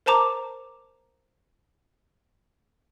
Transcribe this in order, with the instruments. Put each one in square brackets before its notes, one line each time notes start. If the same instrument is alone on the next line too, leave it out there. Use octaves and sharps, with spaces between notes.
[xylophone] A#4 C5 A5 A#5 D6